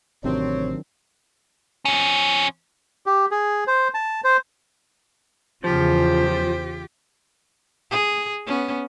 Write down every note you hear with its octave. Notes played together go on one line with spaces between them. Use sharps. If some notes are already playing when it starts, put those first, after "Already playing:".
A1 C3 D#3 F#3 C4 D4 C#5
F3 C#4
G4
G#4
C5
A5
C5
E2 C#3 F3 F4 G4 C5
G#4
B3 C#4